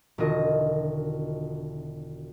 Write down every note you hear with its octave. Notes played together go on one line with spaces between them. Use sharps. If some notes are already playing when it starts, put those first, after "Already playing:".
E1 D3 D#3 F4 F#4 D#5